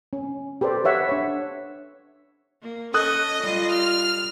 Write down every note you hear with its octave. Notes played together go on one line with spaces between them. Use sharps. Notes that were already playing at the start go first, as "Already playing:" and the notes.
C#4
G4 A4 B4 C5 D5
B4 C#5 E5 F#5
D4 C#5
A#3
C#4 A4 D#5 D#6 F#6
G3 F4
F6